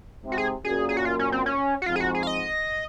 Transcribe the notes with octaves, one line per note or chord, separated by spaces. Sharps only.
G#2 C3
F#4
G#4
F#2 A#2 G#4
G#4
F#4
F4
C#4
C4
C#4
F#4
F2 G#2 F4
G#4
F#4
G#4
F5
D#5